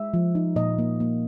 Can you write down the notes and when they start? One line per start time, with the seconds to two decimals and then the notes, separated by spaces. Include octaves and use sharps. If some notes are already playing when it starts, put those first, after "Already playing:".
Already playing: G#3 E5
0.14 F3
0.35 D#4
0.56 A#2 D#5
0.79 A#3
1.00 A#3